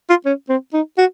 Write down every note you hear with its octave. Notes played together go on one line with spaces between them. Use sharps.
F4
C#4
C4
D#4
F#4